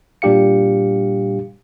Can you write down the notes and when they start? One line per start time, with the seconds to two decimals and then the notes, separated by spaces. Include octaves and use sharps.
0.22 A#2 G3 D4 G4 F5 C#7